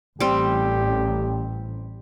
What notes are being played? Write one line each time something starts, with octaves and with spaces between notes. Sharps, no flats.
A1 G3 C4 G4